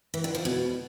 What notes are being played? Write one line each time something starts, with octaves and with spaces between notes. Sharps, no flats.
E3
D3
F3
B2